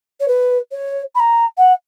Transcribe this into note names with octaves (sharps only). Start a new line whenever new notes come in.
C#5
B4
C#5
B5
A#5
F#5